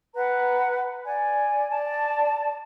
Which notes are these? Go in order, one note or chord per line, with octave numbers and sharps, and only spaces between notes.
B4 F#5 A#5
D5 G#5
D5 A5